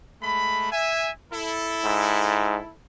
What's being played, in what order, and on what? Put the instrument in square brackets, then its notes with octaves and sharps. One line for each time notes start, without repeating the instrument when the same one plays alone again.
[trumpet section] G#3 A3 B5
E5 G#5
E4 A4
[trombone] G#2